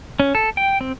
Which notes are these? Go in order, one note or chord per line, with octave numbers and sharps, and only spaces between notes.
C#4
A4
G5
C4